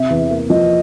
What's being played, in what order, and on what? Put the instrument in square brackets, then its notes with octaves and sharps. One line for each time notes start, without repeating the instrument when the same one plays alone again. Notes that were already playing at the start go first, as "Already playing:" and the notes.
Already playing: [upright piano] C3 [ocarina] E5
[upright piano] E2
A#3
[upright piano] F3 [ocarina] D#5